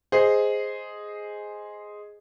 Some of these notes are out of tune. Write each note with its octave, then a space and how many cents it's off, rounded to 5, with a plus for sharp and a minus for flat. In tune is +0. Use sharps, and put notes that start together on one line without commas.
G#4 +0 C5 +0 D#5 +0